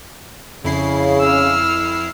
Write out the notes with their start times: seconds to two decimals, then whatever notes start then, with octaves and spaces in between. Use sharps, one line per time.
0.65 F2 C#3 E4 C7
1.21 E6 F6